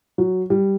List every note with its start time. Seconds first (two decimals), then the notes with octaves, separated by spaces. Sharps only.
0.18 F#3
0.50 G3